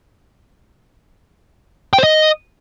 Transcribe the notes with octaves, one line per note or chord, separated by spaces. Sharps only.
G5
C5
D#5